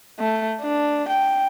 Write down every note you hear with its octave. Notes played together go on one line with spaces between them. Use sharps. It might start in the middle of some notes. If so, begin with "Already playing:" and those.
A3
D4
G5